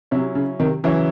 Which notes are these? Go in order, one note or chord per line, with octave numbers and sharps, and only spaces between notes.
C3 F#3 C#4 E4
C#3
C3 D#3
C#3 E3 F#3 C#4 E4